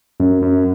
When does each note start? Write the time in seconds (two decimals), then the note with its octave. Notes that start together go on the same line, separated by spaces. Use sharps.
0.20 F#2
0.42 F#2